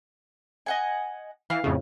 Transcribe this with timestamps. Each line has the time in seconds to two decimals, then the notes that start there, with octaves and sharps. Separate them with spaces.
0.66 D#5 F#5 G#5
1.50 E3 F5
1.64 F2 A2 C#3